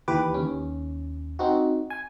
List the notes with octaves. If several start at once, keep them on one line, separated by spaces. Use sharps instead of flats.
D#2 E3 G4 B4 D6
D#2 C#4
C4 D#4 F#4
G#5